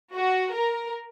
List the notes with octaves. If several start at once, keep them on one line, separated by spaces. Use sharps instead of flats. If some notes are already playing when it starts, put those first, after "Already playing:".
F#4
A#4